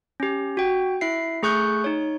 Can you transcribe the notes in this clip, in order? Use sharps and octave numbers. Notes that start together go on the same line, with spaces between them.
C#4 G4
F#4 G5
E4 E5 C7
A3 G#4 C#6 F#6 G6
D#4 C#5